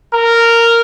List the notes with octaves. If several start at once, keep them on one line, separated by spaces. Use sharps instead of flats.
A#4